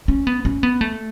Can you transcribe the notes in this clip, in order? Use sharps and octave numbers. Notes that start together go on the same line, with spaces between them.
C#4
B3
C#4
B3
A3